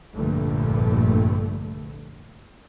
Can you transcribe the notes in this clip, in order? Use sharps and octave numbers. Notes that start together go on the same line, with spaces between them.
F1 A#1 G2 A#2 D3 A3